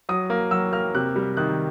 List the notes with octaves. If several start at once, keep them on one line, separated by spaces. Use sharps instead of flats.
F#3 D#6
A#3
F#3 E6
A#3 F6
C3 F#6
G3
D#3 F#6